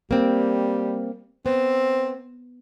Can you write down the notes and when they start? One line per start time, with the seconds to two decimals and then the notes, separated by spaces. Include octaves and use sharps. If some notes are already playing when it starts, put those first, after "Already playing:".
0.11 G3 A#3 C4
1.46 B3 C4